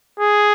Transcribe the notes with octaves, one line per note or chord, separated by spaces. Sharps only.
G#4